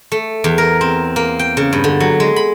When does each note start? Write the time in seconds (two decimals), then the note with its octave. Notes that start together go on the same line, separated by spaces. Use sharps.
0.12 A3
0.44 E2
0.58 A#4
0.81 C4
1.16 A#3
1.39 G5
1.57 C#3
1.73 G2
1.84 D3
2.00 F#3
2.20 G#3
2.36 B5